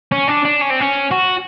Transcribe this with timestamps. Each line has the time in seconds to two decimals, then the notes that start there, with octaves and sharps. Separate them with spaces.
0.12 C#4
0.28 D4
0.45 D4
0.62 C#4
0.71 C4
0.81 C#4
1.11 F#4